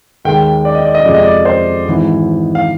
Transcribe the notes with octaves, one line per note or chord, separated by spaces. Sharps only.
D#2 D#3 G#3 G5
D5
D#5
D5
D#5
F2 C3 F3 G#3 D5
D#5
D5
C5
G#1 G#2 E3
F5